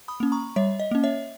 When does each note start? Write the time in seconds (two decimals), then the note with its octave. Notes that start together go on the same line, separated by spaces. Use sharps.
0.08 B5 D#6
0.20 A#3 C#4
0.32 A#5 C#6
0.56 G3 C#5 E5
0.80 D#5
0.91 A#3 C#4
1.04 C#5 E5